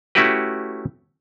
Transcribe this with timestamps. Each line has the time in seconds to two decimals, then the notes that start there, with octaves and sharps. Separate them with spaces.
0.15 A3 C#4 E4 F#4 G4 B4